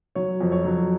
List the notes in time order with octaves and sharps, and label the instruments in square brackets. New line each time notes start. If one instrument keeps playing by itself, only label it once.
[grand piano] F#3 C#5
F2
C#5
F#3